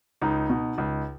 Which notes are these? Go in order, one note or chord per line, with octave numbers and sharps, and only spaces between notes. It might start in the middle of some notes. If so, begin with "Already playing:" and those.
C#2 D#4
B2
C#2